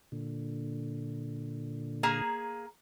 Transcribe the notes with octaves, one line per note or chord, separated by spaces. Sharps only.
A#2 D3
A#3 G#4 A#5